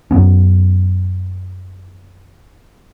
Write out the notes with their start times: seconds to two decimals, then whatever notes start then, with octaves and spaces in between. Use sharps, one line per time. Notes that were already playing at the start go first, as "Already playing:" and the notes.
0.11 F#2 F#3 B3 C#4